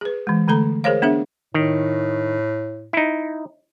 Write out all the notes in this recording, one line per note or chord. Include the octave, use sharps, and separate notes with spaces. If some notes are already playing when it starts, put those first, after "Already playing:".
G#4 B4
E3 G#3
D3 A3 A4 A#5
G#4 A#4 C5 C#5 F5
B3 D4 G#4 E5
A2 D#3
D#4 E4